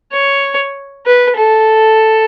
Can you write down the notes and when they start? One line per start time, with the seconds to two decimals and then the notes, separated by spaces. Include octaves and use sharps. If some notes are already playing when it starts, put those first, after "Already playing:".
0.12 C#5
1.06 B4
1.37 A4